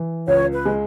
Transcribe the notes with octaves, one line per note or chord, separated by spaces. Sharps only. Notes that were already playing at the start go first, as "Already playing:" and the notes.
Already playing: E3
C#2 C#5
B4
G#3